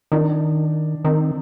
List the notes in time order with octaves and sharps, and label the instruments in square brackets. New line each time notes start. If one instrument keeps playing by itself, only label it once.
[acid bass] D#3 [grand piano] D4
[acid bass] D#3 [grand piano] C4